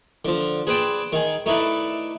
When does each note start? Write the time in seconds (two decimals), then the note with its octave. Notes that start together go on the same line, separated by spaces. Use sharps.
0.25 D3 F3
0.67 G#4 B4 C5 D5 G5 A5
1.12 D#3 G#4
1.46 A3 D#4 E4 B4 D5